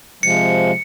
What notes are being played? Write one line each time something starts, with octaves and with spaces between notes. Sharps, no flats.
C3 F3 G#3 C#7